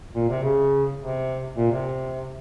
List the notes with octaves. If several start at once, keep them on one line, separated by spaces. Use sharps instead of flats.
A#2
C3
C#3
C3
A#2
C3